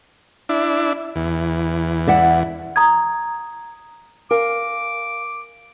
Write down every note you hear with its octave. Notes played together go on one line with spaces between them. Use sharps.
D4 E4
E2
D5 E5 F#5
A#5 D#6 G#6
A#4 F5 G#5 D6